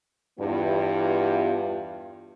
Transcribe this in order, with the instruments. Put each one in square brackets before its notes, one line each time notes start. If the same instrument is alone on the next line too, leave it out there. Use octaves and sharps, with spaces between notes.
[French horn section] E2 G2 E3 B3 F4 G4